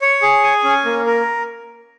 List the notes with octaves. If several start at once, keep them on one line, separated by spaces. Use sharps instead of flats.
C#5
G#4
G#5
C#4
A#3
A#4